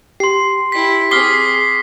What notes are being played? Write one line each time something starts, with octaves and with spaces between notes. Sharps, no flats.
G4 C6 C7
E4 G5 B6
C4 G#4 D6 D#6 F6 B6 C7 G7